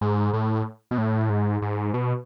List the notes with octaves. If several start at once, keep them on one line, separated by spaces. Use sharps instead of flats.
G#2
A2
B2
A2
G#2
G#2
B2